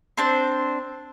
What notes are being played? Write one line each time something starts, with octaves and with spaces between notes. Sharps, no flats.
C4 D4 C5